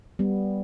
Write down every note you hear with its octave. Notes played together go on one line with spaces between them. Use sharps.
G3 B3